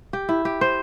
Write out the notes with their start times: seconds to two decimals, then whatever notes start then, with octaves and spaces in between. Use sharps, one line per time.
0.13 G4
0.29 E4
0.45 G4
0.61 C5